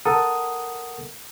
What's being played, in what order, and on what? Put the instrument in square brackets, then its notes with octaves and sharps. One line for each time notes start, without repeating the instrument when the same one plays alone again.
[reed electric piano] A4 A#4 F#5 D#6